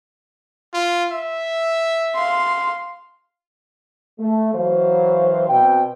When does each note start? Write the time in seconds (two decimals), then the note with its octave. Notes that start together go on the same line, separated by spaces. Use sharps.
0.74 F4
1.11 E5
2.15 F5 C6
4.20 A3
4.54 E3 F#3 C5 F5
5.49 B2 C4 G5